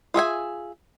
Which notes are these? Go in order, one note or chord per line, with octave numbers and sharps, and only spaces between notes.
F4 G#4 E5 G#5